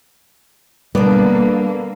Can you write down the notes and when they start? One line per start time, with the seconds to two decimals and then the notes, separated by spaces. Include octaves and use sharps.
0.95 B2 D3 G3 A#3 B3 D5